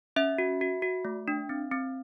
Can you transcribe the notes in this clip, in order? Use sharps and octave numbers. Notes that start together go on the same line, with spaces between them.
C#4 E5
F#4
F#4
F#4
A3
D4
C4
C4